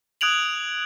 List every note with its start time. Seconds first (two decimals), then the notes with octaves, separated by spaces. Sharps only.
0.21 D#6 F#6 G#6 D7 F7 F#7